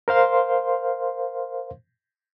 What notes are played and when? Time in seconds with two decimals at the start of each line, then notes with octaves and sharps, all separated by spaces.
0.08 A#4 C5 F5 C6